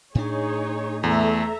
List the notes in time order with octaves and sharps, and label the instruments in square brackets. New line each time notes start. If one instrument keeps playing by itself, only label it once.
[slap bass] A2 D4 [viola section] D#4 G#4 C#5
[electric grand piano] E2 [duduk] A3 [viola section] A4 E5 A#5